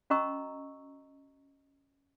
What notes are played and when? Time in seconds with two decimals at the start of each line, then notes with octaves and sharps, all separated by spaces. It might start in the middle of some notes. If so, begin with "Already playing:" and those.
0.10 C#4 F#4 D#5 A#5 C#6 E6